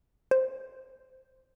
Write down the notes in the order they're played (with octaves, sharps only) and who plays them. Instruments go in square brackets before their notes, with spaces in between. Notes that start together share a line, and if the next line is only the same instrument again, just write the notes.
[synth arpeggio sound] C5